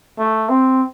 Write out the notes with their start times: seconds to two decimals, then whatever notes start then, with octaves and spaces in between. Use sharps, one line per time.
0.19 A3
0.50 C4